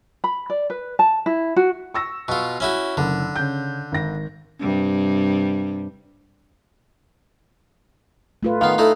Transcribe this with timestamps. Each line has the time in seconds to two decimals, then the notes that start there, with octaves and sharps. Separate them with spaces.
0.24 B5
0.50 D5
0.70 B4
0.99 A5
1.26 E4
1.56 F#4
1.94 C#6 E6 A#6
2.28 B2 F4 C#6
2.60 C#4 E4 F#4
2.97 F#1 D3
3.36 C#3 G6
3.92 G#1 A#6
4.60 G2 C3 G3
8.43 A3 F4 B4
8.61 D#3 B3 F5
8.78 A3 D#4 E4